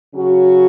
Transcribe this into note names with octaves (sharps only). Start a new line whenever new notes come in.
C#3 F#3 C#4 F#4